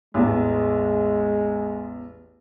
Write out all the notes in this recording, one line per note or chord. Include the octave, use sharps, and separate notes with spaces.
A1 E2 G#3